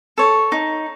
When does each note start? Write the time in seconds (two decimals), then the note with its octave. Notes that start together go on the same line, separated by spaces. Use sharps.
0.18 A4 C#5
0.52 D#4